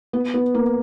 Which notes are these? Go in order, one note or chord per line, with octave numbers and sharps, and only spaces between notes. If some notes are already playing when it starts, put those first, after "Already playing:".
B3
B3
A#3